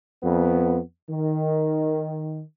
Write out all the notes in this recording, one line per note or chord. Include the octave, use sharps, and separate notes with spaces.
F2 B3
D#3